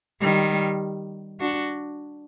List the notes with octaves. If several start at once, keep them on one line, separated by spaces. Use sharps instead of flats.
D#3 G3
D4 F#4